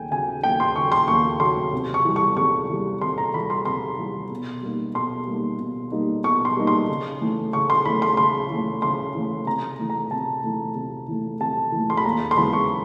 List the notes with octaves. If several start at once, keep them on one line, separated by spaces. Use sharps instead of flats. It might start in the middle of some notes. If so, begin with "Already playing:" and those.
Already playing: D#2 C#3 G5 G#5
C#3 F#3 G#5
D#2 G5
C6
C#3 F#3 C#6
C6
D#2 C#6
C#3 F#3 C6
C3
C#6
E3 G3
C#6
C3 C#6
E3 G3
C3 C6
A#5
E3 G3 B5
C6
C3 C6
E3 G3
B2
G3 A#3 D#4
B2 C6
G3 A#3 D#4
B2
G3 A#3 D#4
B2 C#6
C6
G3 A#3 D#4
C6
C#3
E3 A3
C#3 C#6
C6
E3 A3 B5
C6
C#3 C6
E3 A3
C#3 C6
E3 A3
C3 A#5
E3 A3
A#5
C3 A5
E3 A3
C3
E3 A3
C3 A5
E3 A3
C6
B5
D#2 A#5
C6
C#3 E3 G#3 B3 B5
C#6